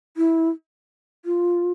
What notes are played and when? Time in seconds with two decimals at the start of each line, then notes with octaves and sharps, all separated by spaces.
0.17 E4
1.25 F4